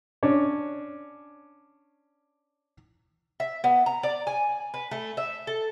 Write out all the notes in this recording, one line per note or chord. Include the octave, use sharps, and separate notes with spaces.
C#4 D4 C#5
E5
B3
A#5
D5
G#5
B4
A3
E5
A4